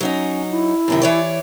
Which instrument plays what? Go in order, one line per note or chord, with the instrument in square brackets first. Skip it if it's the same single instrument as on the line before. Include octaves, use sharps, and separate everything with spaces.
[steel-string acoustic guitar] F#3 D#4 D#5 [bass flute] C#4
[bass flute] E4
[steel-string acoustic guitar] F#2 C3 D#3
E3 C#5 D5